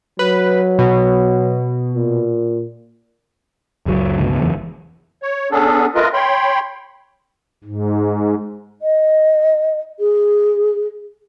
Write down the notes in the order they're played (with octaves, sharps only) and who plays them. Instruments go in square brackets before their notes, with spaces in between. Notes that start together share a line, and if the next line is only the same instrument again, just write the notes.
[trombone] F#3 [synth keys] B4
[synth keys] B2
[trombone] A#2
[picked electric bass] F#1 C#2 F#3
G1 C#2 B2
F#1 E2 A2 E3
[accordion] C#5
B3 C#4 D4 G#4 A4
A3 F4 A#4 B4 D#5
C#5 G5 B5 C6
[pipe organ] G#2
[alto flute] D#5
G#4